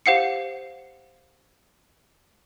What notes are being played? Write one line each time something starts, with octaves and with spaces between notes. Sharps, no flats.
G4 C5 F5 F#5 C7 C#7